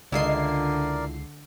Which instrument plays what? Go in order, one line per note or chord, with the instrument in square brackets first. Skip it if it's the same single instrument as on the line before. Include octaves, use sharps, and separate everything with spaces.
[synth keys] C#2 C7 [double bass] D3 [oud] E4 F4 D#5 [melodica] A#4 D5